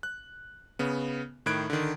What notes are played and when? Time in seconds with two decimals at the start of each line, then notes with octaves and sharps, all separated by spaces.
0.03 F#6
0.79 C#3 B3
1.46 A2 D#3 B5 F#6 G#6 D7
1.70 D3 D#3